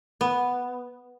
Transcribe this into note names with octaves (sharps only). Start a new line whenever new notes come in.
B3